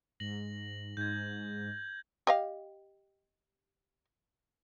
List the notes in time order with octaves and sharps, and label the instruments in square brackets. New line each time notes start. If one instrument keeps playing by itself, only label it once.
[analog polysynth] G#2 [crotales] A#6 F#7
[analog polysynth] G#2 [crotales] G6 G#6
[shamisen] G4 D#5 F5